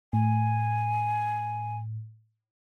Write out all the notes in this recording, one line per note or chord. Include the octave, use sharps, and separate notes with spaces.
A2 G#5